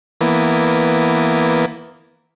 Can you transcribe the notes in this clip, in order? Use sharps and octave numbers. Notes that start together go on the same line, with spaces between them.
E3 A#3 B3